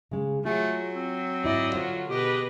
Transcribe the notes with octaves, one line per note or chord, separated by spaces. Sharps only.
C#3 G#3
F#3 A3 F4 G#4 G#5
C4
G#2 E4 F#4 D5 D#5
D3 F4 F#4 C5
B2 G4 G#4 B4 D#5